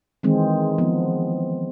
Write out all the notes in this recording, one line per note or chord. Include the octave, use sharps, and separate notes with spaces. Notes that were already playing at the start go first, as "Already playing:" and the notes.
D#3 E3 G#3 C4
F3 B3